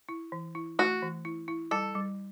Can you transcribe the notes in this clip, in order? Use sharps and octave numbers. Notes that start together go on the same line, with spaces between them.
E4
E3
E4
A3 F#4
E3
E4
E4
G3 A4
G3